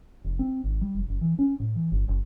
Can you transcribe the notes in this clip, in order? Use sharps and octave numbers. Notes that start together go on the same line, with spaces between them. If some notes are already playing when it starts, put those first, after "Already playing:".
F1
C4
G#1
G3
F1
F#1
E3
C#4
A2
E3
G1
F#1